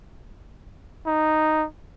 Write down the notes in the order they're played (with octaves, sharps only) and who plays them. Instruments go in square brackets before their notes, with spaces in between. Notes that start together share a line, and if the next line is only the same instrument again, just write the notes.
[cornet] D#4